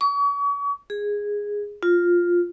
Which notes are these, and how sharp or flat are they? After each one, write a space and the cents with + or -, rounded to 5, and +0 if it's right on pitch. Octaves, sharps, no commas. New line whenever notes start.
C#6 +40
G#4 -10
F4 +5